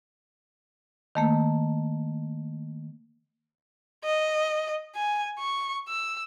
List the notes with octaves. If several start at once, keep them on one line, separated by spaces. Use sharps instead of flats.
D#3 A3 A#3
D#5
G#5
C#6
E6